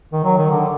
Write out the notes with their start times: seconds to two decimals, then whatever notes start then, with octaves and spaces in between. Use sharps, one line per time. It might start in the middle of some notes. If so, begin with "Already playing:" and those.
0.13 D#3
0.24 F#3
0.38 D#3
0.51 D3